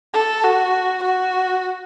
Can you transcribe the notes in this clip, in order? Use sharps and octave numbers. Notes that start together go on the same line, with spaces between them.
A4
F#4
F#4